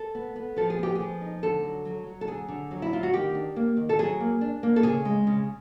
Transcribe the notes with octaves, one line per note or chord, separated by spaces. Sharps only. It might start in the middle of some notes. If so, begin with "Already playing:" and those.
Already playing: A4
B3
B3
F3 A4
G#4
B3 G4
F3 G#4
D#4
D3 A4
F#3
F#3
F#3
A4
D3 G#4
D3
F#3
E4
D3 F4
F#4
D#3 G4
D4
A#3
D#3
A4
F#3 G#4
A#3
D4
A#3
A4
C#3 G#4
G#3
C#3